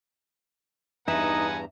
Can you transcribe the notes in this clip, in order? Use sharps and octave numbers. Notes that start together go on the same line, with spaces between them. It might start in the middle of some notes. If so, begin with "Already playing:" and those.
E2 G2 D#4 B4 E5 F#5 G#5 A#5